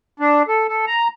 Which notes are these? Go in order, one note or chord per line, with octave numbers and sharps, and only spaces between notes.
D4
A4
A4
A#5